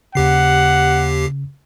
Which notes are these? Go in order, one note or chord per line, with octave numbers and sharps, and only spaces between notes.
D#2 C#3 G4 F#5 C7